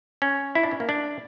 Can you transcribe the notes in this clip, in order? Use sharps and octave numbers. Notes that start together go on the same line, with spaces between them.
C#4
E4
D4
C#4
A#3
D4